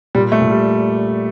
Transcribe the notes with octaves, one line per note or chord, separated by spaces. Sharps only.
A#2 G3
A3
A#2
G3